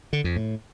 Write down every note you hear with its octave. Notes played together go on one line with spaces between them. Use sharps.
D3
F2
A2